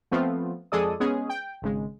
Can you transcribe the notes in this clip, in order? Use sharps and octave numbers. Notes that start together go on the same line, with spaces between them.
F3 A3 B3 C4 F4
F2 G#3 G#4 A4 D5 D#6
G#3 B3 C#4 G#4
G5
G#1 C#3 G#3